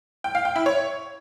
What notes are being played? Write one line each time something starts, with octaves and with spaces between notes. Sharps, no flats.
G5
F5
G5
E4
C#5